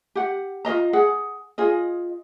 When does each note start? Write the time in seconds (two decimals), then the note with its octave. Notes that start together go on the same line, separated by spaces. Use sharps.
0.15 G4 F#5
0.65 F4 G#4 D#5 A#5
0.93 G#4 F#5
1.58 F4 G#4 D#5